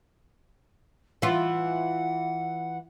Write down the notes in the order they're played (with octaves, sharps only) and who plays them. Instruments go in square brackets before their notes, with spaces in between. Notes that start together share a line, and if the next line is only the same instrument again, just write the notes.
[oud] E3 F4 [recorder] F#5